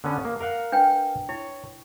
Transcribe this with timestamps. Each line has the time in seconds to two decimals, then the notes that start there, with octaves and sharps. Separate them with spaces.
0.04 D3 B3 C#4
0.25 A#3
0.41 A#4 F5 F#5
0.72 D4 B4 G5
1.29 E4 C#5